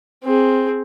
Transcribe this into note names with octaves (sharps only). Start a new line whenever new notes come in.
C4 G#4